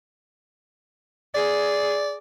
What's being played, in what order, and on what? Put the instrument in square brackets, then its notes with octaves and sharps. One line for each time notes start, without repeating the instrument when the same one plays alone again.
[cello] G#4 [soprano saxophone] D5